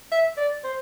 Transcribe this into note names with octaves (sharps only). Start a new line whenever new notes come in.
E5
D5
C5